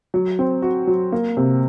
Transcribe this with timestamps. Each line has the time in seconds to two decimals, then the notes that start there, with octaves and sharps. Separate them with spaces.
0.14 F#3
0.39 C4
0.62 F#4
0.87 F#3
1.12 A#3
1.37 C3